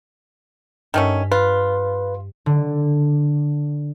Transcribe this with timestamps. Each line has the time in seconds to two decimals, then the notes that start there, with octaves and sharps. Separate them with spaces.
0.94 G2 D#3 A3 C#4 G#5 B6
1.32 F4 B4
2.46 D3